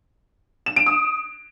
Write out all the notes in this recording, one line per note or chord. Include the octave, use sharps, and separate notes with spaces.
E7
D7
D#6